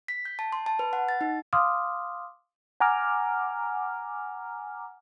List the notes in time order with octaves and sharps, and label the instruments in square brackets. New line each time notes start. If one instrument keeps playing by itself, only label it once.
[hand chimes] B6
G6
A5
C6
A5
B4
F#5
A6
D#4
[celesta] F5 C6 D6 D#6 F6
[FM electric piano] F#5 G#5 A#5 D6 F6